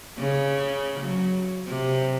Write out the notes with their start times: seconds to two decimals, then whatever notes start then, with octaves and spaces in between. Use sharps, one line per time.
0.18 C#3
1.00 F#3
1.67 C3